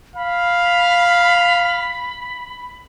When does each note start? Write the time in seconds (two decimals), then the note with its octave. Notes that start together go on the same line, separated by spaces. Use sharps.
0.16 F5 B5